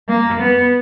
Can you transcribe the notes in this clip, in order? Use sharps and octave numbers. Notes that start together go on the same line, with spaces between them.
A#3
B3